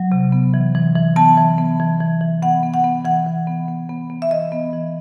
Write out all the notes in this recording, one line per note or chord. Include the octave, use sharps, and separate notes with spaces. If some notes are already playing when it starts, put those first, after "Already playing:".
Already playing: F#3
C3
B3
E3
E3
E3
B3 A5
E3
B3
E3
E3
E3
B3 F#5
B3
F#5
B3
E3 F#5
E3
B3
B3
B3
B3
E5
E3 D#5
B3
E3